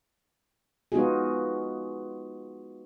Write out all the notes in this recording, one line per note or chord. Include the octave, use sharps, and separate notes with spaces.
G#3 B3 D#4 F4 F#4 G#4